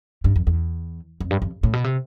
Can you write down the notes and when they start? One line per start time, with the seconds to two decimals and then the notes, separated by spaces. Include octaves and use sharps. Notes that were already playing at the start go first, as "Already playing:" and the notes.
0.24 G2
0.36 F2
0.47 E2
1.20 F2
1.31 G2
1.42 F2
1.63 A2
1.73 B2
1.84 C3